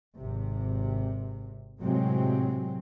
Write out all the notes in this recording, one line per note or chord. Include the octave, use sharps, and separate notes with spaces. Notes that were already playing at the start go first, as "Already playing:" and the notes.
G#1 C3
A2 C3 F#3 G#3 C4